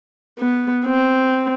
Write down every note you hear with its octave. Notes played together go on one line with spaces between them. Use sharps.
B3
C4